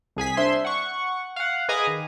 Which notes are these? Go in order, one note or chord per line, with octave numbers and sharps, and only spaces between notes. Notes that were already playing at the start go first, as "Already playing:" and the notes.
C2 G#4 G#5 B6
D4 C5 E5 C6
F#5 C#6
F5 F#5
G#4 B4 D#5 G#5 A#5 D6
D#3